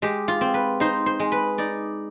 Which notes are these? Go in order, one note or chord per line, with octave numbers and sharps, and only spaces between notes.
G#3 G4
F4
C4
B4
D#4 C5
C5
G#3
B4
D#4 D5